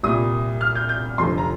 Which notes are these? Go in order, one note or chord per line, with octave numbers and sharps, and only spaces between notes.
C2 A#2 G3 D#6
F6
G6
G6
F1 F2 D3 F3 C6
A#5